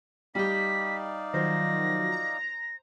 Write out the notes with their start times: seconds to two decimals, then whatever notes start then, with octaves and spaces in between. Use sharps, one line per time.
0.35 G3 D#4 G4 D5 F5 B6
1.34 D#3 F3 F#3 C5 A#6
2.12 A#5